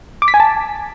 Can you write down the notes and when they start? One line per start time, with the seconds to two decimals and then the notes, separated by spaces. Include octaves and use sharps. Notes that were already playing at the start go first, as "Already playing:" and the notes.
0.22 D6
0.28 B6
0.34 G#5
0.40 A5